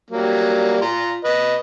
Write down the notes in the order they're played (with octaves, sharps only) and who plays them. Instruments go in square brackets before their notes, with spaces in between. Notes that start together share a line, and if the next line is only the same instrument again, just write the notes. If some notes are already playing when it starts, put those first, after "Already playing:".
[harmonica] F#3 G3 A#3
F4 A#5
B4 D#5